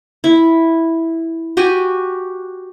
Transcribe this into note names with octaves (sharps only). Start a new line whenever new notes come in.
E4
F#4 G4 G#5